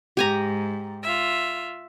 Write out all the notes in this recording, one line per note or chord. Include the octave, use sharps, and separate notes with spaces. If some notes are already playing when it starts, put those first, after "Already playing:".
G#2 G4 G#5 A#5
F4 E5